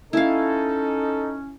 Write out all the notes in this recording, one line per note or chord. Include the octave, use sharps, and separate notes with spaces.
C#4 D#4 E4 A4 F5